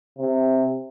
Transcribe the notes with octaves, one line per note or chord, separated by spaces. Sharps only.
C3